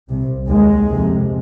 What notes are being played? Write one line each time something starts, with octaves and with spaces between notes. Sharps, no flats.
C2 C3
D#2 G#3
F2 C3